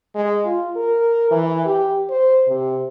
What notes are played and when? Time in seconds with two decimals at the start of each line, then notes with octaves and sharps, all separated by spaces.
0.15 G#3
0.45 F4
0.76 A#4
1.31 E3
1.65 G4
2.10 C5
2.48 C3